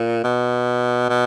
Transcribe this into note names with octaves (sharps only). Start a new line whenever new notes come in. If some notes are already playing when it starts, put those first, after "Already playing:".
Already playing: A#2
B2
B2